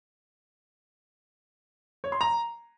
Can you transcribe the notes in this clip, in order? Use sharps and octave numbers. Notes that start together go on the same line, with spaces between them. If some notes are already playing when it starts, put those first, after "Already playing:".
C#5
C6
A#5